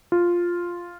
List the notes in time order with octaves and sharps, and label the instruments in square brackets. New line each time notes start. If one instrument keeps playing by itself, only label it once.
[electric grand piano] F4